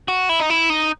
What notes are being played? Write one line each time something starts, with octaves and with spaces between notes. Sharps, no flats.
F#4
E4
D#4
E4
D#4